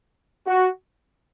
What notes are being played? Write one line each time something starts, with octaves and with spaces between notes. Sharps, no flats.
F#4